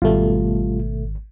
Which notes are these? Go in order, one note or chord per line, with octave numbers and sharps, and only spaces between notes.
G#1 B2 G3 A3 F4